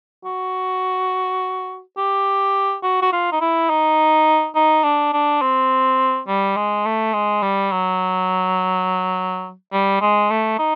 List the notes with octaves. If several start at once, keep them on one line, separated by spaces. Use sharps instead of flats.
F#4
G4
F#4
F#4
F4
D#4
E4
D#4
D#4
D4
D4
C4
G3
G#3
A3
G#3
G3
F#3
G3
G#3
A3
D#4